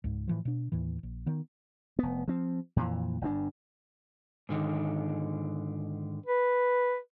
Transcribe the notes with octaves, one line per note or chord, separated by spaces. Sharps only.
C#2 G#2
A2 E3 F3
B2 D4
D#2 A2 E3
A#1
D#3 B3
F1 B3
F3 C4
F2 A#2 E3
G1 G2 C4 D4
G#2 D3 D#3
B4